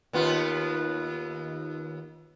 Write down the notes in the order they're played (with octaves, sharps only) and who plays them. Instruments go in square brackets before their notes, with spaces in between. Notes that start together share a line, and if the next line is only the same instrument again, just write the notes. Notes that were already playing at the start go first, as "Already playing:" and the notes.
[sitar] D#2 B3 F4